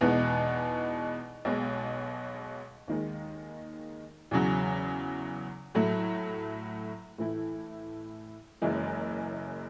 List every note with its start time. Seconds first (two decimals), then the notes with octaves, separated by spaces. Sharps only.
0.01 E2 B2 G#3 B3 D#4
1.45 B1 B2 G#3
2.88 D#2 D#3 G#3
4.31 E2 C#3 F#3
5.75 A2 F#3 A3
7.18 A2 E3 A3 E4
8.62 F#1 F#2 E3 G#3